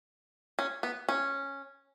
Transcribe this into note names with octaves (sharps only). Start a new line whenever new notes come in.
C#4
B3
C#4